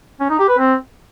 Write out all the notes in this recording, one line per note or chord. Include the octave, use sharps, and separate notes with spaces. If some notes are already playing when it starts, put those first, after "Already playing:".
C#4
D#4
G4
B4
C4